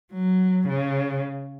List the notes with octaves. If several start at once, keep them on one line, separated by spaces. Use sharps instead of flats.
F#3
C#3